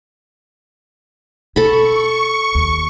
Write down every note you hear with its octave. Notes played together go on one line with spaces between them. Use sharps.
B2 A4 B5 C#6
D#2